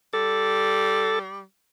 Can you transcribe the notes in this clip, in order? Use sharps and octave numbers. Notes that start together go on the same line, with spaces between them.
G3 A4